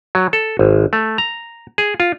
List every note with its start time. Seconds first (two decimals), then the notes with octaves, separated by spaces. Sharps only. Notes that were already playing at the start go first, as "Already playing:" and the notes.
0.15 F#3
0.33 A4
0.59 G#1
0.93 A3
1.18 A#5
1.78 G#4
2.00 F4